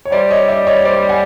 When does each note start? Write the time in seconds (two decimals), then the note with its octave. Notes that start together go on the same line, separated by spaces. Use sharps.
0.05 C#5
0.12 G3 C5 D5
0.30 C#5 D#5
0.48 D5 E5
0.67 C#5 D#5
0.85 C5 D5
1.09 F#5 G#5